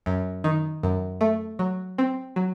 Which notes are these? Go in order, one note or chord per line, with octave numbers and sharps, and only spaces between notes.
F#2
D#3
F#2
A3
F#3
C4
F#3